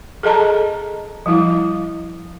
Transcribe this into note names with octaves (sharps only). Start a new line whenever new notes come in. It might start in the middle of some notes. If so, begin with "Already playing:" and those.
G#4 A4 D#5 A5 A#5
F3 G3 E4